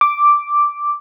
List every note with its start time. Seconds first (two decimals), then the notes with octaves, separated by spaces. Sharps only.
0.01 D6